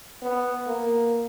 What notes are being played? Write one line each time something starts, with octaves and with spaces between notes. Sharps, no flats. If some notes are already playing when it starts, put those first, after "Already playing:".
B3
A#3